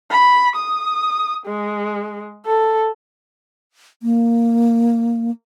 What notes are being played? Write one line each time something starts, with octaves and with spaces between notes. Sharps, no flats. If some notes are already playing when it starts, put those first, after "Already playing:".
B5
D#6
G#3
A4
A#3